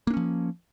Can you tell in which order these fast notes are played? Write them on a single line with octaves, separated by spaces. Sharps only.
A#3 D4 C#4 F3